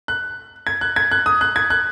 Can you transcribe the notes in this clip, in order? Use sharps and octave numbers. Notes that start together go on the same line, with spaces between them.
F#6
G#6
F#6
G#6
F#6
D#6
F#6
G#6
F#6